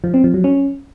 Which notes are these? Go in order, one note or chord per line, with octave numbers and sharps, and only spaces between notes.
F3
C4
F3
F#3
C#4